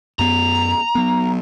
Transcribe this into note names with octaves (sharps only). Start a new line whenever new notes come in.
F#2 B3 A#5
F#3 B3